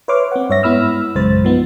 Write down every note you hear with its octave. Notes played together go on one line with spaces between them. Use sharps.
B4 C#5 E5 C6 D6 F6
C4 F#5
G2 C#5 E5 A#6
G#2 B3 E4 B5 E6 F6
A#1 F#2 C#3 G#3 C5 A6
F3 B3 D#4